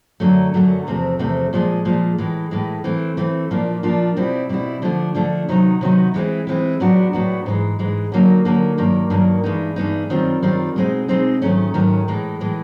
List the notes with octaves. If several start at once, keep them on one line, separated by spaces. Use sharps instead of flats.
F#2 D3 F#3 A3
F#2 D3 F#3 A3
E2 C3 F3 A3 C4
E2 C3 F3 A3 C4
A#2 F3 G#3
A#2 F3 G#3
A2 E3 G#3
A2 E3 G#3
E3 A3 C4
E3 A3 C4
A#2 F3 A#3 D4 F4
A#2 F3 A#3 D4 F4
B2 G3 C4 E4
B2 G3 C4 E4
D3 F3 A3 D4
D3 F3 A3 D4
C3 D#3 F#3 B3 D#4
C3 D#3 F#3 B3 D#4
E3 G#3 C4 E4
E3 G#3 C4 E4
A2 F#3 B3 D4 F#4
A2 F#3 B3 D4 F#4
G#2 E3 G#3
G#2 E3 G#3
D3 F#3 A#3 D#4
D3 F#3 A#3 D#4
G2 D#3 F#3 A#3
G2 D#3 F#3 A#3
G2 E3 G#3 B3 D#4
G2 E3 G#3 B3 D#4
F#2 D#3 G3 C4 F4
F#2 D#3 G3 C4 F4
B2 G#3 C4 D#4
B2 G#3 C4 D#4
G#2 D#3 F#3 A3 C#4
G#2 D#3 F#3 A3 C#4
A2 E3 G#3
A2 E3 G#3